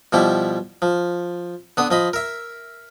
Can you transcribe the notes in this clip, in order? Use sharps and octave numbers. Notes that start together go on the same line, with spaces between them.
B2 F3 G3 E4
F3
D3 B3 D#6
F3 D#5 B5
A#4 E5